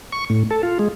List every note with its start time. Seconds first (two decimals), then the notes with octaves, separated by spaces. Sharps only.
0.12 C#6
0.30 A2
0.51 A4
0.63 F4
0.79 G#3